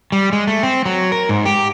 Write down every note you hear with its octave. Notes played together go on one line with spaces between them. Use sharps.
G3
G#3
A3
C4
F#3
A#4
G#2
G4